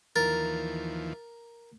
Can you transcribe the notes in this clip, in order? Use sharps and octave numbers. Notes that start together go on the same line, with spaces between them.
D#2 E3 F3 A#4 A6